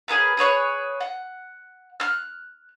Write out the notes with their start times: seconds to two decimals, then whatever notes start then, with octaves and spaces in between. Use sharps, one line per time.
0.08 C#4 G#4 A#4 B4
0.37 G#4 B4 C#5 F#6
1.00 F#5
2.00 F6 F#6